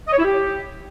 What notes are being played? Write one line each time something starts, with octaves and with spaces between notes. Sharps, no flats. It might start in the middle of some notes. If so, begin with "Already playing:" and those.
D#5
C#5
E4
G4